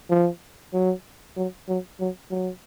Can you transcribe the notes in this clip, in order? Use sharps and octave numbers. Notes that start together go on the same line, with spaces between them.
F3
F#3
F#3
F#3
F#3
F#3